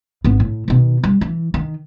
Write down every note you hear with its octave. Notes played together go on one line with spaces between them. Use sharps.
G#1 B3
A2
B2 D#3
G3
E3
D#3